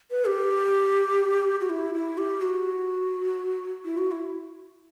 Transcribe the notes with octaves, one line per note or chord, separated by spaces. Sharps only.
B4
G4
F#4
E4
E4
G4
F#4
E4
F#4
E4